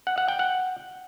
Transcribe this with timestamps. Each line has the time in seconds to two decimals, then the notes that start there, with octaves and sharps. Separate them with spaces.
0.07 F#5
0.18 F#5
0.28 G5
0.39 F#5